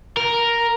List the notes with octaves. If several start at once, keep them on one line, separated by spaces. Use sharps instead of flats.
A#4